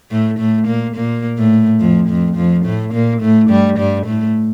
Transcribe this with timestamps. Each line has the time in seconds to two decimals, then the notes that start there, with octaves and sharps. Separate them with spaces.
0.11 A2 A3
0.39 A2 A3
0.67 A#2 A#3
0.95 A#2 A#3
1.38 A2 A3
1.80 F2 F3
2.08 F2 F3
2.36 F2 F3
2.65 A2 A3
2.93 A#2 A#3
3.21 A2 A3
3.50 G2 G3
3.78 G2 G3
4.06 A2 A3